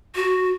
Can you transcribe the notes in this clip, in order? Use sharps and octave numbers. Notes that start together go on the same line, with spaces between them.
F#4